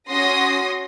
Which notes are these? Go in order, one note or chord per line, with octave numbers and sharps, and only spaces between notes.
C#4 F#4 C6 D#6 A#6